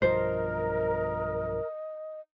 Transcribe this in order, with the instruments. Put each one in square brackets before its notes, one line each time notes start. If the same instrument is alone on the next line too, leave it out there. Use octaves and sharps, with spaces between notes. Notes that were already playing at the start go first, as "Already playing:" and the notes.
[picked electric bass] B1 G2 F3 [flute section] A#4 [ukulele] C5 [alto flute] D#5